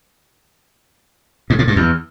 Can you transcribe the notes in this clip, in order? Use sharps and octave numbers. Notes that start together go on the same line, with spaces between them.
G#2
A2
G2
E2